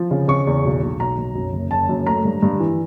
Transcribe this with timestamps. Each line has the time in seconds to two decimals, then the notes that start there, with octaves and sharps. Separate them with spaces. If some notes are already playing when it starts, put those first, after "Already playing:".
Already playing: F3
0.11 C#3
0.28 C#3 C#6
0.47 E2
0.65 B1
0.82 B1
1.00 B1 A#5
1.18 B1
1.35 F#2
1.53 F#1
1.71 F#1 A5
1.89 F#2
2.07 A3 A#5
2.25 G2
2.43 G2
2.60 E3